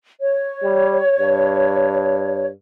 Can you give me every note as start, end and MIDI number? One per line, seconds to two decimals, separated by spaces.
0.20 2.48 73
0.63 1.01 55
1.19 2.51 43